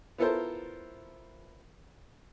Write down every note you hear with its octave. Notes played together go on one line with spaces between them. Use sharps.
B3 E4 F4 A4 A#4 C5